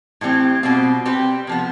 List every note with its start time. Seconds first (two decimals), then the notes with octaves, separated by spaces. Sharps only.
0.21 A2 E3 G3 C4
0.63 B2 G3 C4 F4
1.05 G3 C4 G4 B4
1.47 C3 F3 B3